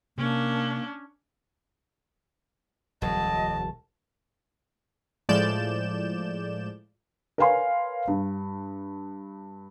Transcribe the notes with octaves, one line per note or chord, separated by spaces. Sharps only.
C3 A#3 C#4 D4
E1 D2 F#3 D#5 A5
A2 F3 G#3 D5 G6 E7
A#4 B4 C#5 F5 G#5 C6
G2